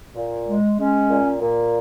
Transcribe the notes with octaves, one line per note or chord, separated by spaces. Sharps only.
A#2
G#3
G#3 C#4
A#2
A#2